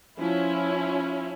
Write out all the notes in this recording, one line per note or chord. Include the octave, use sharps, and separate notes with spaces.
F3 C#4 E4